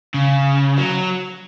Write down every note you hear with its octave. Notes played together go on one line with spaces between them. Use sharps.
C#3
F#3